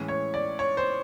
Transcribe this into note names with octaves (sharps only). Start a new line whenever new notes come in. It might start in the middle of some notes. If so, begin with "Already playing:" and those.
Already playing: A2 E3 G#3 C#4
C#5
D5
C#5
C5